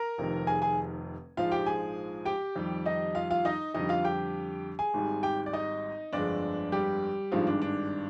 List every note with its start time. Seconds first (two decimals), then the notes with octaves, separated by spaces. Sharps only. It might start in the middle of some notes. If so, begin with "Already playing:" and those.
Already playing: A#4 A#5
0.18 F1 F2 C3 D#3
0.47 G#4 G#5
0.62 G#4 G#5
1.37 A#1 G#2 F3 G#3 F4 F5
1.51 G4 G5
1.66 G#4 G#5
2.26 G4 G5
2.56 F2 D#3 G3
2.85 D#4 D#5
3.15 F4 F5
3.30 F4 F5
3.45 D#4 D#5
3.74 F2 D3 G3 D#4 D#5
3.89 F4 F5
4.05 G4 G5
4.79 G#4 G#5
4.94 G#1 G#2 G3
5.23 G4 G5
5.46 D5
5.53 D#4 D#5
6.13 G1 F2 D3 G#3 D4 D5
6.72 G3 G4
7.32 G#1 G2 D#3 F3 G#3 F4
7.47 D4
7.62 D4